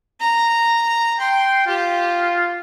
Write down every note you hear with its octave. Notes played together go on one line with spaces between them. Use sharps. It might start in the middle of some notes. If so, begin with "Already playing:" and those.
A#5
G5 C6
F4 G4